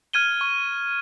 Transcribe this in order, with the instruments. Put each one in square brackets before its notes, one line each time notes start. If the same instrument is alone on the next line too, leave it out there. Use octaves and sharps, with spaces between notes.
[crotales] F6 G#6 D#7 G7
C#6